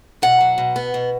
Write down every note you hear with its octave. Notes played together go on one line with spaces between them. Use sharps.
B2 F#5
F#3
B2
B3
B2